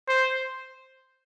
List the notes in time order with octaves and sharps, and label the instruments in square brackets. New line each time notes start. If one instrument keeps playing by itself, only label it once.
[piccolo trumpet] C5